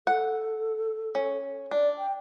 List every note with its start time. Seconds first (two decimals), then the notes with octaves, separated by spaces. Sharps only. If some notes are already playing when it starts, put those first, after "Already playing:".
0.07 A4 F#5
1.15 C#4
1.71 D4 D5
1.98 G5